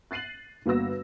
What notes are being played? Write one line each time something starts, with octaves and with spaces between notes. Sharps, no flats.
F#6 A6 C7 D#7 F#7
G1 A#3 F#4 B4 E6 A#6